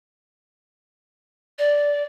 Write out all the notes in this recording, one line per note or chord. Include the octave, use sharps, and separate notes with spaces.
D5